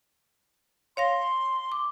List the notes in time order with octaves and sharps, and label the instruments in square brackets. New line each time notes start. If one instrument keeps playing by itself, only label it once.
[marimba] C#5 F5 A#6 [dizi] C6
[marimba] D6